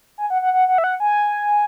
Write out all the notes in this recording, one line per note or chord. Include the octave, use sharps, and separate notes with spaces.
G#5
F#5
F#5
F#5
F#5
E5
F#5
G#5